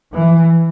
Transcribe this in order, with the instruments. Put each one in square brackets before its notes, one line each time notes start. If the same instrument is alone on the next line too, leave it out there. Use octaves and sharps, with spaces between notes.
[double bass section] E3